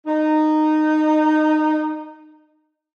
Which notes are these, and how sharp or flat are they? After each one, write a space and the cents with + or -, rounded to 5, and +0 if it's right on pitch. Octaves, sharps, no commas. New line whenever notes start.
D#4 -15